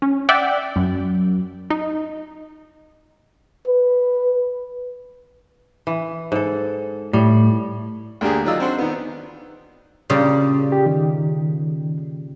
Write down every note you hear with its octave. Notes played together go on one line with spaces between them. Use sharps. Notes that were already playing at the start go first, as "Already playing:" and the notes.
C#4
D5 E5 F#5 G5
F#2
D#4
B4
E3
G#2 A4
A2 G3
D2 A#3 D4 G4 G#4
D#3 F#3 F4 D5 D#5 E6
C4 D4 F#4 F#5 C6
D#3 B3
A#2 C#3 G3
G4
D#3